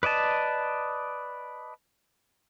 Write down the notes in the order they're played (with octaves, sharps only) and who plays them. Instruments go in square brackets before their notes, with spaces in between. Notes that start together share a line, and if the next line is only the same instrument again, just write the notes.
[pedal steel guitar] B4 D5 D#5 A5